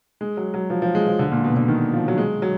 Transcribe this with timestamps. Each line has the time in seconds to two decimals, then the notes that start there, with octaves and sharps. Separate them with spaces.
0.21 G#3
0.37 F#3
0.54 F#3
0.70 F3
0.82 F3
0.95 G#3
1.07 F3
1.19 D3
1.31 A#2
1.44 B2
1.56 D3
1.68 D#3
1.93 F3
2.08 F#3
2.18 G#3
2.42 F#3